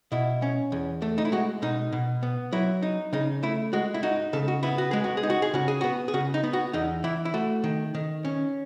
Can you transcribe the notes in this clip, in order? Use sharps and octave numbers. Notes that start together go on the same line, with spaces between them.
B2 E4
C#4
E2
A3
D#4
E4
G#3 F#4
B2 D#4
B2
B3
F#3 E4
D#4
C#3 D#4
A3 E4
G#3 F#4
E4
D#4 F#4
C#3 A4
F#4
B3 E4
F#4
G#3 G#4
F#4
G#4
D#4
F#4
G#4
C#3 F#4
G#4
B3 F#4
G#4
C#3 F#4
D#4
B3
F#4
E2 D#4
E3 E4
E4
A3 F#4
D#3
D#3
C#4